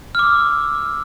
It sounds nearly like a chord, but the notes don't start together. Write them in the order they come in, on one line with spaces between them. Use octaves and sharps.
F6 D6 E6